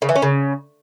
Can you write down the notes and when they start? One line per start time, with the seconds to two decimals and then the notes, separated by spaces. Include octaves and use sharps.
0.02 C#3
0.09 E3
0.16 C#4
0.22 C#3